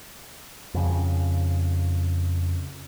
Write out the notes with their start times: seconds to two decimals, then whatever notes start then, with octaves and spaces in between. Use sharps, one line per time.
0.74 F2 C#3